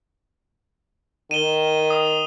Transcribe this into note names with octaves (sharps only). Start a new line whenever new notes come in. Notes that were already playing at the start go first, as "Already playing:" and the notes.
D#3 D#7 E7 G7
D#6